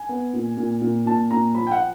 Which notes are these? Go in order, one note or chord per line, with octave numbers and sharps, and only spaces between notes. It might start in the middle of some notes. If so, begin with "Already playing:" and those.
Already playing: G#5
B3
A#2
A#2
A#2
A#2 A5
A#2 A#5
F3 B5
G5
F#5